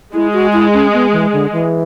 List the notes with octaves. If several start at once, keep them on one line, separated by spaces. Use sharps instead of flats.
G#3 E4
F#4
E4
C#4
B3
E3
D3
E3